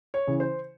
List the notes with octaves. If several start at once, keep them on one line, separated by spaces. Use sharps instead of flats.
C#5
C#3 E3
C5